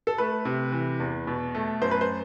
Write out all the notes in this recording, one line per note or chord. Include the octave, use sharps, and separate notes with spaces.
A4
A3 B4
C3
E3
E2
B2
A3
F#2 C5
B4
C5